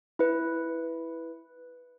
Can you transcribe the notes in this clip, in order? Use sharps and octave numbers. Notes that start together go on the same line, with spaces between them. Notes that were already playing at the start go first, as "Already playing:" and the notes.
E4 B4